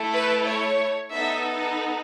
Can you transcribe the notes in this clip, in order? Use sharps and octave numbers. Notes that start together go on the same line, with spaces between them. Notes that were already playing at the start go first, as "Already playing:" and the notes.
Already playing: A3 E4 A4
B4
C#5
B3 D#4 A4 E5